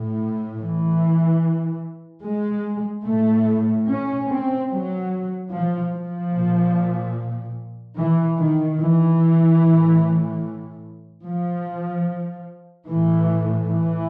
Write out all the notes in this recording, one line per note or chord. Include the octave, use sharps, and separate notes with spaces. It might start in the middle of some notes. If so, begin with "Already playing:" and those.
Already playing: A2
E3
G#3
A2 A3
C#4
C4
F#3
F3
F3
A#2
E3
D#3
E3
A2
F3
A2 E3
E3